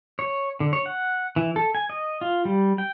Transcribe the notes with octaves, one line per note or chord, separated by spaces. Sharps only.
C#5
D3
C#5
F#5
E3
A4
G#5
D#5
F4
G3
G5